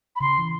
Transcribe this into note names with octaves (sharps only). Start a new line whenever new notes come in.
B5
C#3 C6
E3